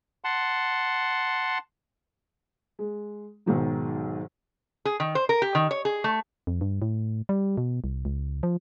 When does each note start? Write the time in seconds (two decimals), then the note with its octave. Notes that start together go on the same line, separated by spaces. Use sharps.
0.24 F#5 A5 C6
2.79 G#3
3.46 B1 G#2 D#3 F#3
4.85 G#4
5.00 D#3
5.15 C5
5.29 A#4
5.42 G4
5.55 D#3
5.71 C#5
5.85 G#4
6.04 A3
6.47 F2
6.61 G2
6.82 A2
7.29 G3
7.57 B2
7.84 C2
8.05 C#2
8.43 F3